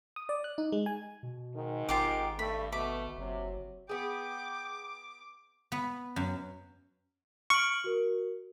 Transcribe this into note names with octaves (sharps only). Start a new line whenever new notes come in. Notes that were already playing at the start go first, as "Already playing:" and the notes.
D#6
D5
F#6
D#4
G#3
G#5
B2
G#2 D#3
G#1 F4 G4 D6
G2 A3 B5
B2 A3 B5 D6
F#1 C3 F#3
B3 G#4 G5 D6
B3
F#2
C#6 F6 D7 F#7
F#4 A#4